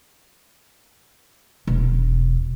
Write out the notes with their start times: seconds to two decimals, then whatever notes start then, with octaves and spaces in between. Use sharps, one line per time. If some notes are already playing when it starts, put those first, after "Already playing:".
1.67 E1